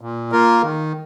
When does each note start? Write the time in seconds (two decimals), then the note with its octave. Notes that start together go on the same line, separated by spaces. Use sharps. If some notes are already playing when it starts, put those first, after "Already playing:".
0.01 A#2
0.32 A#3 F4 A#4
0.62 D#3